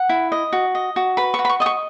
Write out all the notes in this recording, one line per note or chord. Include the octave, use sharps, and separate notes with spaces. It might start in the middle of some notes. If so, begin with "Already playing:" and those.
Already playing: F#5
E4
D#5
F#4
D#5
F#4
B4 B5
C#6
F#4
B5
C#6
D#5 D#6
C#6